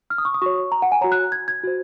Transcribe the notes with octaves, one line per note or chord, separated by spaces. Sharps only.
F6
D#6
C#6
D#6
F#4 C#5 C#6
A#5
F#5
G#5
F#4 C#5 A#5
F#6
G#6
G#6
F#4 C5